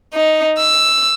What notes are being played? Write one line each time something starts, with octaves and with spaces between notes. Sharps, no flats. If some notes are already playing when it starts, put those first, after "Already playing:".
D#4
E6